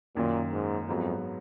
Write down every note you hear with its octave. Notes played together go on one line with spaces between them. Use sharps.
F#2 A#2 D#3 A#3
G#2
F2 G#2 F#3 B3